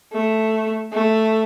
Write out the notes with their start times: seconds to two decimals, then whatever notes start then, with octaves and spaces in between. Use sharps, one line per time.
0.13 A3
0.93 A3